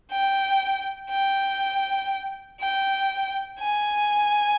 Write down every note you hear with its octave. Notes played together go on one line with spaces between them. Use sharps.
G5
G5
G5
G#5